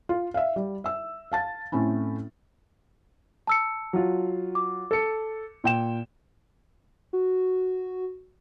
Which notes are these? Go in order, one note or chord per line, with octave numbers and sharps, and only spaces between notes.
F4
E5 F5
G3
E5 E6
F5 A5 A6
A2 A3 C4 C#4 E4
A5 E6 C#7
F#3 F4
D6
A4 C#7
A#2 G5 E7
F#4